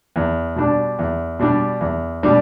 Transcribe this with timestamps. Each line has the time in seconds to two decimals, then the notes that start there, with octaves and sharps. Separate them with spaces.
0.16 E2
0.56 B2 G3 D4
0.99 E2
1.39 B2 G3 D4
1.81 E2
2.23 B2 G3 D4